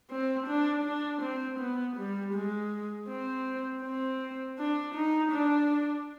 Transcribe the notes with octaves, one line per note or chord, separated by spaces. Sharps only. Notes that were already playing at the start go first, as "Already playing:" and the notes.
C4
D4
D4
C4
B3
G3
G#3
C4
C4
D4
D#4
D4